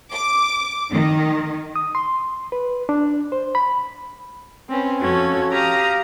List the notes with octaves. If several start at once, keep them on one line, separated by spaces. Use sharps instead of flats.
D6
D#3
D#6
C6
B4
D4
C5
B5
C4 C#4 B4
F2 F3 C#4 F#4 A4 G#6
G4 F5 A#5 D#6